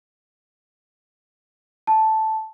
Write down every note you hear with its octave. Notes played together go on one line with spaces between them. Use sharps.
A5